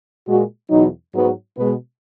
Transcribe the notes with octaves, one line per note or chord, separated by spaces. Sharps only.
A#2 G#3 F#4
E2 B2 F#3 D#4
G#2 F#3 B3
B2 G#3 B3